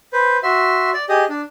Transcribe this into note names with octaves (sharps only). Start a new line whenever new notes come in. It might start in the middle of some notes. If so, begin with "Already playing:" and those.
B4 C5
F#4 E5 C6
D5
G4 G#4 D#5
D4